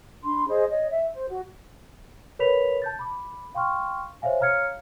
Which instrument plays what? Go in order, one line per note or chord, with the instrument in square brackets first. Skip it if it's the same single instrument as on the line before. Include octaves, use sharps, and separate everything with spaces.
[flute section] D4 B5 C6
G#4 C5 D#5
C#5 D#5
E5
C5
F#4
[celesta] A#4 B4 C#5 B5 B6 F7
A5 G6 A6
B5 D6
F5 G5 C6 C#6 F6
C5 C#5 E5 F5 G#5
C#5 F5 A#5 F6 G#6 C#7